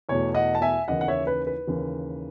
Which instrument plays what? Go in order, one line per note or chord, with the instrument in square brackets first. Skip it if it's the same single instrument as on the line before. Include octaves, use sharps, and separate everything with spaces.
[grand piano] E2 B2 A3 C#5
D#5 F#5
A5
E5 G#5
D#2 C#3 E3 D#5 F#5
F#5
C#5 E5
B4
B4
D#2 C#3 E3